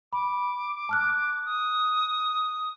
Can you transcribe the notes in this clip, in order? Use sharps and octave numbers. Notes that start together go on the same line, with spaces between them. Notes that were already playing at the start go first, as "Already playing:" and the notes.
B5 D6
A5 F6 F#6
D#6